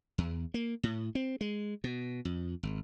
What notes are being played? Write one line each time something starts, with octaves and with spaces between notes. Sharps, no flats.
E2
A#3
A2
C4
G#3
B2
F2
G#1